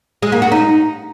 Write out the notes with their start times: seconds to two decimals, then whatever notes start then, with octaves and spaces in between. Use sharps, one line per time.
0.22 G#3
0.32 A#3
0.42 F#4
0.52 D#4